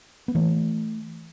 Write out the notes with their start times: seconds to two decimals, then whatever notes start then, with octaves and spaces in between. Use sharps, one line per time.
0.28 B3
0.35 E3 A3